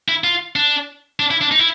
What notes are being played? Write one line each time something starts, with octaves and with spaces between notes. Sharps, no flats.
E4
F4
D4
D4
E4
D4
D#4
E4